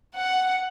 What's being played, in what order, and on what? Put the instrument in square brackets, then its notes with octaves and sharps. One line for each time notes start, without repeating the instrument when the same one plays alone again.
[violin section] F#5